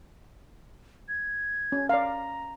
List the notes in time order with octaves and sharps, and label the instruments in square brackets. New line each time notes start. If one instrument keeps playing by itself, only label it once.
[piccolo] G#6
[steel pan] C#4
[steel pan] D5 F5 [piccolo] A#5